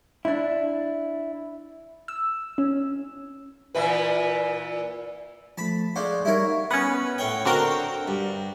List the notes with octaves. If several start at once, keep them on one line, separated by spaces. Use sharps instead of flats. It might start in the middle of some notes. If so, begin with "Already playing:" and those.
D4 E4
E6
C#4
A#2 E3 B4
F3 A3 A5 B5
G#3 D4 C5 F5 F#5 C#6
G3 D#4 E4 A#4 C#5
B3 C#4 B4 F#5
A2 C#5 G5
D3 C4 F#4 A#4 F5 G5
G2